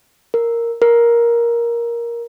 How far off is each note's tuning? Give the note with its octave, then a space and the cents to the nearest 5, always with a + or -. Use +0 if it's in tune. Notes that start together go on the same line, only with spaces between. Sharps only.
A#4 -5
A#4 +10